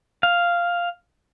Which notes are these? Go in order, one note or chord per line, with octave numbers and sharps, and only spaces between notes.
F5